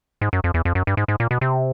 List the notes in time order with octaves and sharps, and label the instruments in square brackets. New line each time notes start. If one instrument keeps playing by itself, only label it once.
[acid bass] G#2
F#2
F2
E2
F2
F#2
G2
G#2
G#2
A#2
B2
C3